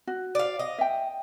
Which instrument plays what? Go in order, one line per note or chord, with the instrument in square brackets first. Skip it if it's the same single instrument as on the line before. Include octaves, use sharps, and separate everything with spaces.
[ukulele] F#4
[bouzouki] D5 F5
D#5
[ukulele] E5 G5